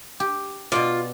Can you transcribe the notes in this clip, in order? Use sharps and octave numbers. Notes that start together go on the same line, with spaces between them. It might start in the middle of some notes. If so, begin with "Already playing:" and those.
G4
B2 F4 D5